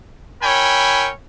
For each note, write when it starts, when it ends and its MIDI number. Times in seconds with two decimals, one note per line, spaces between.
0.41 1.10 64
0.41 1.10 70
0.41 1.10 73
0.41 1.10 79
0.41 1.10 80
0.41 1.10 83